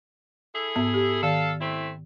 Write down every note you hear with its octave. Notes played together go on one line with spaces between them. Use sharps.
E4 G#4 A4
G#2 B3 E5
G4
D#3 A4 F5
A3 C4 E4